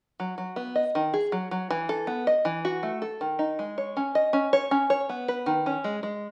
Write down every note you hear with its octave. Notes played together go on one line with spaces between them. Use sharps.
F#3
F#3
B3
D#5
D#3
G#4
F#3
F#3
E3
A4
B3
D#5
E3
F#4
A3
A4
D#3
D#4
G#3
C#5
C#4
D#5
C#4
C#5
C#4
C#5
B3
B4
D#3
C#4
G#3
G#3